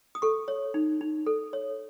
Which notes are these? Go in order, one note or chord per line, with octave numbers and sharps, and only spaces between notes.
D#6
A4 C#6
C#5
D#4
D#4
A4
C#5